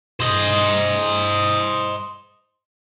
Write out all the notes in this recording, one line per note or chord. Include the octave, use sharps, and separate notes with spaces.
C5 D#5